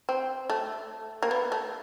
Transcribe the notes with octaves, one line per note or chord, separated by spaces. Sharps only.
C4
A3
A#3
B3
A3